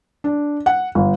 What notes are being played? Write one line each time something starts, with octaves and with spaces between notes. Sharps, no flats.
D4
F#5
G1